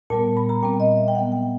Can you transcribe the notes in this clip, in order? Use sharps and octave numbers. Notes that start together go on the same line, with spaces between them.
A#2 G3 B3 A5
B5
A#5
A#2 G3 C4 G5
D#5
E5
G5
A#2 F#3 B3 F#5
G5